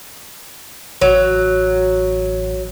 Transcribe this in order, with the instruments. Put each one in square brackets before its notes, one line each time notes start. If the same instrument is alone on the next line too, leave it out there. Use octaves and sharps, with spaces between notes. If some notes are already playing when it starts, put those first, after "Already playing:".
[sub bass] A1 [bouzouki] F#3